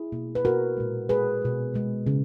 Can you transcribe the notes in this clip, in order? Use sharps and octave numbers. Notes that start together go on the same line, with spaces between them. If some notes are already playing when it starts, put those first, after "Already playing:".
Already playing: E4 G#4
B2 A#3
B4
B2 A#3 F#4 A#4
A#2 G#3
A#2 G#3 G#4 B4
B2 G#3
B2 G#3
C#3